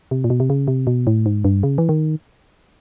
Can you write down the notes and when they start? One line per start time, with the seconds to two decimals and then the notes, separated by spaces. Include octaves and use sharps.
0.11 C3
0.24 A#2
0.30 B2
0.40 C3
0.50 C#3
0.68 C3
0.87 B2
1.07 A2
1.26 G#2
1.45 G2
1.63 C#3
1.78 E3
1.89 D#3